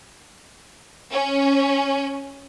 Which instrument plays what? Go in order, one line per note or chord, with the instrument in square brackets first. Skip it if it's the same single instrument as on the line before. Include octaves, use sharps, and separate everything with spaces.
[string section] C#4